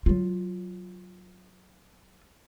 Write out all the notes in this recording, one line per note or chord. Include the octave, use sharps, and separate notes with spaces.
F#3 F4